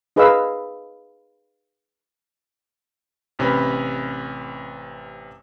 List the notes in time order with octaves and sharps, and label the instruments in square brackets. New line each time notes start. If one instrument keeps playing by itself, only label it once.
[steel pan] D#4 G#4 B4 D#5 F5 E6
[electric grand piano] A1 C3 C#4 B4 B5